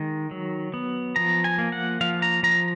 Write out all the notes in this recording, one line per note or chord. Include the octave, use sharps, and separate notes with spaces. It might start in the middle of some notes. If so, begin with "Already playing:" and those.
Already playing: D#3 G#3
F#3
B3
F3 A#5
G#5
A#3
F#5
F3 F5
A#5
F3 A#5